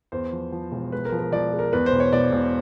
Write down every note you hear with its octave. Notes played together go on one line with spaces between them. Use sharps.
E2 C5
F3
F3
E1
G#3 B4
A#4
F3
A#4
F3 D5
G#3
A#4
E2 B4
C5
E1
C#5
E1 D5
E1